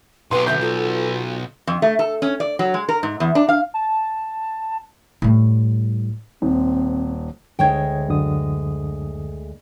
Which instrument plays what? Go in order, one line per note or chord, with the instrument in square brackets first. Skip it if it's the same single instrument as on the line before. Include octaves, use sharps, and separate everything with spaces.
[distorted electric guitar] B1 [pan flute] B4 [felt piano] C6
[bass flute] D3 [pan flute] E5 [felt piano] G6
[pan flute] F4 [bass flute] A4
[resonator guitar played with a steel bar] F2
A3
A4
C#4
D5
F#3
G#3
A#4
G#2
E2
D4
F5
[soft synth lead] A5
[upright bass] A2 G3
[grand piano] D#1 [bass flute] C4
[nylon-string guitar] D2 G#3 G5 [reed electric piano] D3 C#5 G#6
[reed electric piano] F#2 D3 D#6